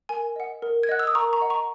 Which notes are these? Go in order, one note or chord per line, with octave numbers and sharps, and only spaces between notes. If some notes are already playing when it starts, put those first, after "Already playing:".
A#4 G#5
D#5 F#5
A#4
G#6
D#5 F#5 F#6
E6
D#6
A#4 A#5 C#6
A#5 C#6
D#5 F#5
A#5 C#6